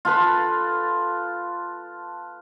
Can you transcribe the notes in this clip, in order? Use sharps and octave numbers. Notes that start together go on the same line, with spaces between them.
F4 A4 B4 B5